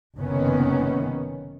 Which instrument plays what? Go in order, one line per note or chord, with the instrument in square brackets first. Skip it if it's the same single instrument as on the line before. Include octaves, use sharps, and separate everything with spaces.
[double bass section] F#1 F#2 C3 D#3 B3 C#4